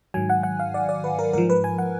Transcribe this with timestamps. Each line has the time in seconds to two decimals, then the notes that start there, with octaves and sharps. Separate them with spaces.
0.14 G#2 D#3 F#3 G#5
0.30 F#5
0.43 F#5
0.59 F5
0.74 D5
0.89 D5
1.04 B4
1.19 A#4
1.33 G#2 F3 A#4
1.50 B4
1.64 G#5
1.78 F#5